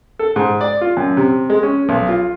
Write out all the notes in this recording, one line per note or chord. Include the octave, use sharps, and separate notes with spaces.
A4
G#2
D5
F4
F#2
C3
G#3
C#4
B1
F4